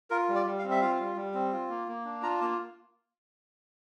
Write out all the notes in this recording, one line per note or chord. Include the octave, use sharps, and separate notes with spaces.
F4 A#4
G3
D5
G3
F5
C4
E5
F4 F5
G3
G3
C4
F4
A#3
A#3
D4
F4 A#5
A#3 A5